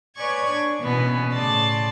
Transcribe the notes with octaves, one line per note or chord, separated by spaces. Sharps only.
B4 C#5 D5 G#5 C#6 G#6
D4
B2 E3 B3 C#4
A2 C#3 D5 A5 C6